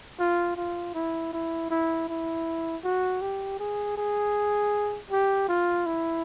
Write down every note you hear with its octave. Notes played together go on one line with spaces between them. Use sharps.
F4
F4
E4
E4
E4
E4
F#4
G4
G#4
G#4
G4
F4
E4